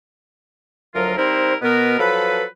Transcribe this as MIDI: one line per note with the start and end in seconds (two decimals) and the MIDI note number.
0.95 1.13 38
0.95 1.13 53
0.95 1.13 54
0.95 1.13 65
0.95 1.13 70
1.17 1.54 55
1.17 1.54 60
1.17 1.54 63
1.17 1.54 64
1.17 1.54 70
1.17 1.54 72
1.62 1.99 47
1.62 1.99 59
1.62 1.99 70
1.99 2.43 53
1.99 2.43 54
1.99 2.43 69
1.99 2.43 71